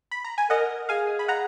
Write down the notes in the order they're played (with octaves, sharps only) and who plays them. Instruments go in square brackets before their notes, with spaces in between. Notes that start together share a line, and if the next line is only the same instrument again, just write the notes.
[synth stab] B5
A#5
G#5
[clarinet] A#4 [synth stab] D#5 F#5
[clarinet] G#4 [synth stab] F5 G#5
[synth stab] B5
F#5 A#5